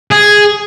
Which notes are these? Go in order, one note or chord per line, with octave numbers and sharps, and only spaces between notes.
G#4